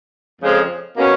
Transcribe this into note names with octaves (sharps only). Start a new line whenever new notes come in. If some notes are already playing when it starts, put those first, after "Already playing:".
F2 C#3 F3 G#3
B2 A#3 C#4